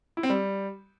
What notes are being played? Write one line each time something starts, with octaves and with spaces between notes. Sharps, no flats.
E4
C4
G3